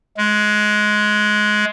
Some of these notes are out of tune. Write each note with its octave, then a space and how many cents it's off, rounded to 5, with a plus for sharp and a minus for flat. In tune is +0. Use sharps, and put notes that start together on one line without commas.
G#3 +15